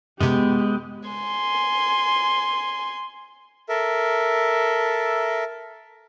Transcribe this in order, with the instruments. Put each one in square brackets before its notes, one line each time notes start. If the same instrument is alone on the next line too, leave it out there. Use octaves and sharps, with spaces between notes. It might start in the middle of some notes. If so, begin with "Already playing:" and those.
[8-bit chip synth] F#2 C3 [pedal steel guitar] G#3 [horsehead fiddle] B3 G4
[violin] G#5 C6
[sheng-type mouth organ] A4 A#4 E5